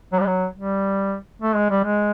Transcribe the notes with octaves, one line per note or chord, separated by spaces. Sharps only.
F#3
G3
F#3
G3
A3
G#3
G3
G#3